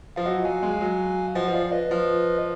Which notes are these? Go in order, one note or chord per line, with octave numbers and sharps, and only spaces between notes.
F3 F5
F#3 D#5 F#5
F#3 F5 G#5
G#3
F#3
F3 D#5 F#5
F3
D5 F5
B4 D#5
F3